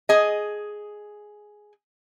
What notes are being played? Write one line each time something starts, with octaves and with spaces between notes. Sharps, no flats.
G#4 D#5